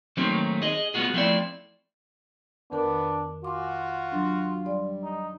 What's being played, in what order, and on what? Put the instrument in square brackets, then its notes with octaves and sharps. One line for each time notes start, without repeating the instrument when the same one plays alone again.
[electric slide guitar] D#3 F#3 A3 A#3 C4 D#4
G#4 D#5
G#3 B3 C4 F4 F#4 G#4
F3 A3 C4 D4 E4 D5
[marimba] F2 D#3 A#4 [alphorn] B3 [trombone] D4
[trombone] F4 [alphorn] F#4 [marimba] G#5 D6
[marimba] F#3 D4
[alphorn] G3 [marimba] D5
[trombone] D#4